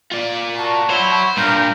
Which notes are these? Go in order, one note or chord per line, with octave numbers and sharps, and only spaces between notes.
F4 D5
F#4 A5
E4 F#4 C5 C#5
G2 A#2 A#4 G6